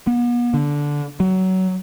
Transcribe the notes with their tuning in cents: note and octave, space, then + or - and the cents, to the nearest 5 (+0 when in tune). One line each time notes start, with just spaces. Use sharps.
B3 -40
D3 -10
F#3 +20